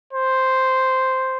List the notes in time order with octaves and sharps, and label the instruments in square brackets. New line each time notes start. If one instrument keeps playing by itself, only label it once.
[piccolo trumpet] C5